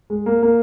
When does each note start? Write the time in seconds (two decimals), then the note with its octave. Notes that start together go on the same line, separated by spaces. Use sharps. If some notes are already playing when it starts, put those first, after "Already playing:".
0.10 G#3
0.26 A#3
0.43 A#3